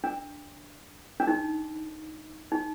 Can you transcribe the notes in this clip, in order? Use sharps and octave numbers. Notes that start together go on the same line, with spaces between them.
D4
D4
D#4
D#4